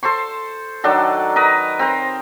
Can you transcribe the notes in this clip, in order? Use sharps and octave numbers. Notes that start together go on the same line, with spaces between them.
A4 C5 C6 C#6
D#3 F#3 D4 A4
A#4 B4 D#5
C4 A#4 C5